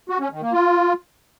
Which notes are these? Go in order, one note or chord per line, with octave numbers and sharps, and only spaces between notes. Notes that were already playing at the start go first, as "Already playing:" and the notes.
F#4
C#4
D#3
A#3
F4